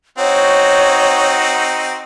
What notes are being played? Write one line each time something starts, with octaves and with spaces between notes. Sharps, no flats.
C4 D#4 F#4 C#5